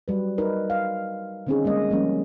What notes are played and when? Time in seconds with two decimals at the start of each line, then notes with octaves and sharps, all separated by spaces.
0.08 F#3 G3 B4
0.38 D#4 A#4 B4 C#5
0.70 F5
1.47 D3 D#3 C4 C#4 D#4 G#4
1.64 G3 G#3 A#3 D#5
1.90 F3 G3 A#3 C#4